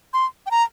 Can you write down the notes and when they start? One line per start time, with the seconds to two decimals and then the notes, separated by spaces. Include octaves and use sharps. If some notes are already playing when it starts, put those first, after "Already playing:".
0.14 C6
0.46 G5
0.51 A#5